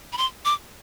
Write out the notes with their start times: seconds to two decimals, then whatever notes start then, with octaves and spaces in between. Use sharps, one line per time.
0.13 B5
0.18 C6
0.45 D6